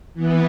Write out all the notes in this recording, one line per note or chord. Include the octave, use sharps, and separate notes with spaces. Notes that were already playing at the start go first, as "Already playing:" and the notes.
E3 B3